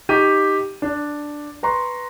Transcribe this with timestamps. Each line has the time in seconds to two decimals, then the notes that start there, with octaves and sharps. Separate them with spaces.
0.09 D#4 G4 C#6 D#7
0.82 D4
1.63 B4 A#5 C6 C#6